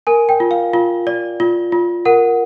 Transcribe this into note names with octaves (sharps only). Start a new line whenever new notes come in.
A#4 G#5
G5
F4
F5
F4
D5
F4
F4
A#4 F#5